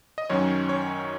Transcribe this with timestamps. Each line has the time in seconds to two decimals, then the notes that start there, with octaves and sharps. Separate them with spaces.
0.18 D#5
0.30 F#2 D#3 F#3 C#4 C#5
0.69 C#5